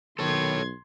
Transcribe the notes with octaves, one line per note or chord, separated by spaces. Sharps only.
B1 D#3 A4 C#5 C6 G#6